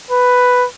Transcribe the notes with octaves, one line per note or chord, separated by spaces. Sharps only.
B4